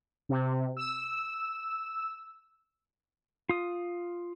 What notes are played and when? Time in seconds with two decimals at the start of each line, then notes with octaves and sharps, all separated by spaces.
0.29 C3
0.77 E6
3.49 F4 D#6